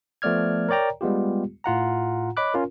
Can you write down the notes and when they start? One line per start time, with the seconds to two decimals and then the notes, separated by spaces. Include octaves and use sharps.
0.22 F3 A3 B3 D5 F6 G#6
0.69 A#4 C#5 D5 G5 A#5
1.01 G3 G#3 B3 F4 G4
1.64 A2 F4 F#5 A#5
2.37 C#5 D#5 B5 D6 F#6
2.54 C#4 F4 A#4